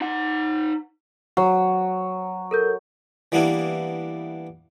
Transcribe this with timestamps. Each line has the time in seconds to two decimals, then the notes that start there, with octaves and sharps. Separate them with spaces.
0.01 D#4 F#5
1.37 F#3 F#5
2.51 A4 A#4 G6
3.32 E3 G3 A#3 B3 D4 E4